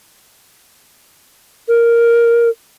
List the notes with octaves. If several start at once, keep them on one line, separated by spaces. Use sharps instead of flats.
A#4